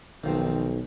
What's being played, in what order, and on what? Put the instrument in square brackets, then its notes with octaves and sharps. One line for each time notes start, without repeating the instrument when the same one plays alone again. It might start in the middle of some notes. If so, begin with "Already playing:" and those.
[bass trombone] B1 [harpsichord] D#3 F3 C4